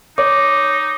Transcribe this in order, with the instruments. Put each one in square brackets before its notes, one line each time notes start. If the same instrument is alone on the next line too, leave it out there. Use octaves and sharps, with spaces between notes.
[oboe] D#4 [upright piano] C#5 [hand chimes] D6